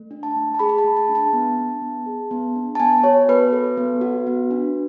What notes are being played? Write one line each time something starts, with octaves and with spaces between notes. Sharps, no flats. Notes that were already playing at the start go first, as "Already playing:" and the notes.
Already playing: A3
D4
A5
A3
A5
G#4 B5
B5
A5
A3
A5
D4
A5
B3
D4
B3
G#4
B3
D4
A5
B3 G#5
F#4 C#5
B3 B4
A4
B3
F#4
B3
D4